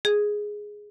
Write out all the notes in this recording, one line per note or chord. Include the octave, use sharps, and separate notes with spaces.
G#4